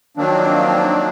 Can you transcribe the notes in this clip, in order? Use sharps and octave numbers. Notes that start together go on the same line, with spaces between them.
D#3 F3 F#3 A#3 C4 D4